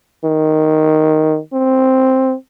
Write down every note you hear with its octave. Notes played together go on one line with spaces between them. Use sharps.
D#3
C4